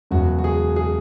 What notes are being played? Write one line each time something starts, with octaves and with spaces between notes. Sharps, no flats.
E1 E2 C#3 F#3 F#4
F#4
G#4
G#4